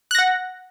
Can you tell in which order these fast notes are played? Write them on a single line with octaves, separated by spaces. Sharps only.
F#6 A#6 F#5